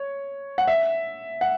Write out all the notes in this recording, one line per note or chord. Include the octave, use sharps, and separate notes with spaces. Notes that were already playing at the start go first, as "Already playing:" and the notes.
Already playing: C#5
F#5
E5
F#5